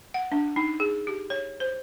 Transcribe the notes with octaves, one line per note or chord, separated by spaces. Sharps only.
F#5
D4
D#4
G#4
G4
C#5
C5